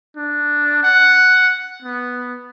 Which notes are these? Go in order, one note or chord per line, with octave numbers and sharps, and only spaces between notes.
D4
F#5
B3